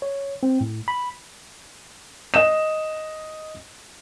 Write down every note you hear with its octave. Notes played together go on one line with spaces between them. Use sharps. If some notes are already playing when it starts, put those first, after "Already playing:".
C#5
C4
A2
B5
D#5 E7